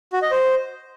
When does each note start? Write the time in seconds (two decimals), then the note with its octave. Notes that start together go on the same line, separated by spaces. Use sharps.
0.13 F#4
0.22 D#5
0.31 C5